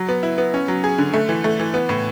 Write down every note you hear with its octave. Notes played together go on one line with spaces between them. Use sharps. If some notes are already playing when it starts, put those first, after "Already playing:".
Already playing: F#3
B3
E4
B3
C#4
F#3
G#4
D3
A3
E3
A3
E3
B3
A2